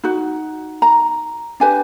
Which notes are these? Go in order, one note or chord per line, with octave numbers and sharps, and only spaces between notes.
D#4 F#4
A#5
D4 G4 B4 G#5